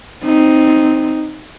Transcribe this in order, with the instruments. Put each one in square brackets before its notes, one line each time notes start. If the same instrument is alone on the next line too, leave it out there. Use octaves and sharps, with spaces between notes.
[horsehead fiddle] C4 D#4